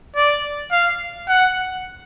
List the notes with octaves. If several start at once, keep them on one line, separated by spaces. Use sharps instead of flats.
D5
F5
F#5